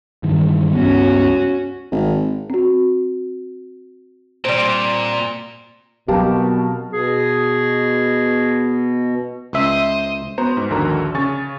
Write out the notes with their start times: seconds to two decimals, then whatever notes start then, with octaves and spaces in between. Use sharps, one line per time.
0.23 G2 D#3 E3
0.73 C#2 G2 B3 C#4 F#4
1.92 G#1
2.50 C4 F#4
4.45 A#2 G3 C4
6.08 B2 F#3 C4 G4 A#4 F5 A5
6.93 B2 G#4
9.53 C#2 C5 D#5 E5
10.38 B3 F#4 C5 A#5
10.57 G#2
10.70 A#1 D#2 D3 F#4 A#4 A#5
11.15 C#3 G#5 C#6 A6